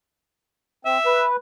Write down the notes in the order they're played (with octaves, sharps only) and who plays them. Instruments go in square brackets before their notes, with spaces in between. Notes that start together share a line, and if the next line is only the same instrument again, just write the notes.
[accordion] C4 [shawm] E5
[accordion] B4